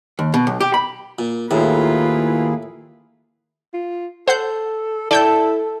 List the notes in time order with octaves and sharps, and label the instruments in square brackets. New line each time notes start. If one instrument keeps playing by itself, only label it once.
[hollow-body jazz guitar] D#2
B2
B1
G4
B5
[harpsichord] A#2
[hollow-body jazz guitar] D#2 [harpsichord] A2 [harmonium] A#3 E4 G#4 [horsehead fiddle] F4 B4
[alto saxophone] F4
[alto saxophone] A4 [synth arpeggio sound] C5 F#5 G6
[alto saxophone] E4 [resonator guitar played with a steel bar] A4 [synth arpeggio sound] D5 G5 G6